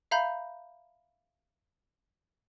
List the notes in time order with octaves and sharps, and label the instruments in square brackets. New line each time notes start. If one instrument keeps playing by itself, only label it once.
[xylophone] E5 F5 A#5 B5 G6